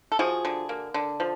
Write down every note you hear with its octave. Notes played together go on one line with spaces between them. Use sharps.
A4
F3 F#4 G#4
D3
A#3
D3
F3